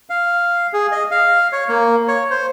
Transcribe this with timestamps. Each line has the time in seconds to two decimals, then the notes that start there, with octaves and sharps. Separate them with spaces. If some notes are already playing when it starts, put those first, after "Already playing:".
0.10 F5
0.73 G#4
0.92 D#5
1.11 F5
1.53 C#5
1.69 A#3
2.08 C#5
2.30 C5